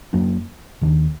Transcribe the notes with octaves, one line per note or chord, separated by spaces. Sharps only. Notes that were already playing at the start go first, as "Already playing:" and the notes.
F#2 F#3 A#3 D4
D#2 D#3 A3 D4